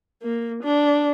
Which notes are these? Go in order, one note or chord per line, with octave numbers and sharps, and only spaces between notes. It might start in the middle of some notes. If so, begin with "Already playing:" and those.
A#3
D4